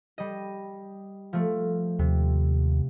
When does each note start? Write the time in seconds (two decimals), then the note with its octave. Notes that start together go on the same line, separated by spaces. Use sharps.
0.18 G3 D#5
1.33 F3 A3
1.99 D#2 C3